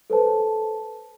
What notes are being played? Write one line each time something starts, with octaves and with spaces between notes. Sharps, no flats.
A4 B4 C5 A5